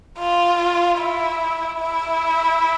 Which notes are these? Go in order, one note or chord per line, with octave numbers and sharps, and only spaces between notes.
F4
E4
E4